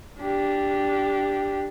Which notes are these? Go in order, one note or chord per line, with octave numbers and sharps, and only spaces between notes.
D4 G4